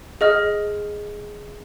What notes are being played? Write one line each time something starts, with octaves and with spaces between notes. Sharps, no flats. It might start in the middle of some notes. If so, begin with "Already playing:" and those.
G#4 D#5 F6